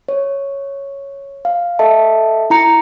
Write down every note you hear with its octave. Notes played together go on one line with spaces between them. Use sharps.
C#5
F5
A4 D#5 E5 A5
E4 A#5 C#7